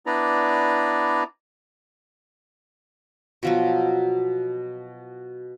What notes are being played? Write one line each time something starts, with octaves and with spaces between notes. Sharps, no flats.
B3 D4 E4 B4 D5 A#5
B2 F3 F#3